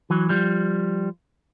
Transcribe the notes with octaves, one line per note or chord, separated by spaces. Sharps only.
E3 F#3
F3 G3